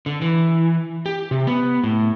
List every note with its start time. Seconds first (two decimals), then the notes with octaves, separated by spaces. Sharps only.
0.06 D3
0.22 E3
1.06 G4
1.31 C3
1.47 B3
1.83 A2